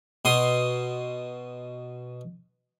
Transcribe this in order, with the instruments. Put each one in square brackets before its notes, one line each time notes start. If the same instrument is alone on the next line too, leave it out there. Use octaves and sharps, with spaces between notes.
[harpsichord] B2 C6 D#6